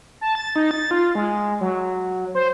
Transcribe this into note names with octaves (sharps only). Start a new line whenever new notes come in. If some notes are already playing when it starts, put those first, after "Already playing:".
A5
A6
D#4
A6
F4
G#3
F#3
C5